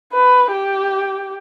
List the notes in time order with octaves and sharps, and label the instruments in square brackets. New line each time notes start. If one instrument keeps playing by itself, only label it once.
[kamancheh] B4
G4